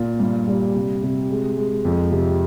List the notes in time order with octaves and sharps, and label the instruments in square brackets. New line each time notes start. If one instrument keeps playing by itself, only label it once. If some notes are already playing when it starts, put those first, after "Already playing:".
Already playing: [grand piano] A#2
G2
G3
C3
C3
G#3
G#3
F2
C3